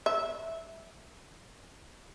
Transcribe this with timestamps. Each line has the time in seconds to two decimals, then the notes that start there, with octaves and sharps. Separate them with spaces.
0.06 E5